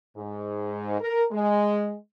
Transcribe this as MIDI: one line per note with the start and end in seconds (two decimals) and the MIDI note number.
0.16 0.98 44
1.00 1.24 70
1.32 1.94 56